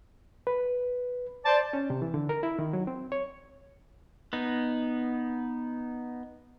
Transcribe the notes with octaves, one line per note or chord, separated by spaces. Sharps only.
B4
C5 D5 A5
C#4
C3
E3
D3
A#4
E4
D#3
F#3
C4
C#5
B3 D#4